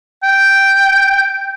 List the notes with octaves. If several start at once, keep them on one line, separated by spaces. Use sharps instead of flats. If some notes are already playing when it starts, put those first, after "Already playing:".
G5